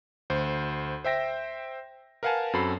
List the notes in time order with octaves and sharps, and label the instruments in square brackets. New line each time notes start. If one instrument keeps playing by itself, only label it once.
[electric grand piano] D2 C5
C5 E5 G5 A#6
A#4 B4 F5 F#5 G#5 A5
F#2 C4 F#4 A4 B5 C7